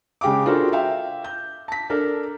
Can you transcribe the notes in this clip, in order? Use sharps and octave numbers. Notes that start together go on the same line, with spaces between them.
C#3 G#3 G4 F5 D6
D4 F4 F#4 A4 A#4 C5
E5 F5 G5
G6
A5 B6
D4 A4 A#4